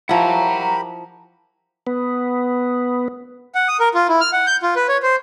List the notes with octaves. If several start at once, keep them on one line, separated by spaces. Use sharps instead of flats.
F3 E4 G4 A#4 F#5 A#5 B5
B3
F#5
D#6
A#4
F4
E4
F6
F#5
G6
F4
B4
C#5
C5